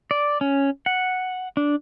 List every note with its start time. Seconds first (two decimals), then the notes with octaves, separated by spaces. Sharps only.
0.11 D5
0.41 C#4
0.86 F#5
1.57 D4